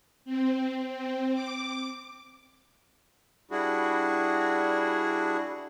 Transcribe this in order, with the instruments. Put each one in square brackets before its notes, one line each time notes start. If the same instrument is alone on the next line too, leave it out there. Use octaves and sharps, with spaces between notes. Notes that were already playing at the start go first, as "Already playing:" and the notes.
[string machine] C4
C4
D6
[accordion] G3 D4 E4 F#4 G#4